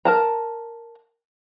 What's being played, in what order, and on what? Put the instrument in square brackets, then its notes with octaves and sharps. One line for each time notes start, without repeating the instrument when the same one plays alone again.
[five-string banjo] A#4 A5 A#5